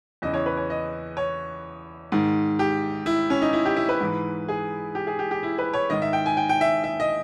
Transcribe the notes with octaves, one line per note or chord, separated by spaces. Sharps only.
E2 C#3 E3 D#5
C#5
B4
C#5
D#5
C#5
G#2 D#3
G4
E4
C#4
D#4
E4
G4
E4
B4
G#2 E3
G#4
G4
G#4
G4
G4
E4
B4
C#5
G#2 D#3 D#5
E5
G5
G#5
G5
G5
E5
E5
D#5